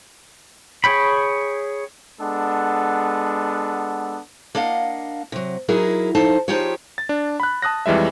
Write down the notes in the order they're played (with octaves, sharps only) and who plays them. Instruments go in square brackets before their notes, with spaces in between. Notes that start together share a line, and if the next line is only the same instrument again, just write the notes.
[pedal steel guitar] G#4 C#5 G5 B5
[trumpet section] G#3 B3 D4 A4 F#5
[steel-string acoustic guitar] A#3 D4 D#5 F5 F#5
C3 F#3
F#3 D#4 E4 G#4 A#4
F3 D#4 A4 C5 A5
F3 D#4 F4 G4 G#4 C#5
[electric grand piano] A6
D4
B5 F#6
A5 D#6 F#6 A#6
F2 E3 G3 G#3 E5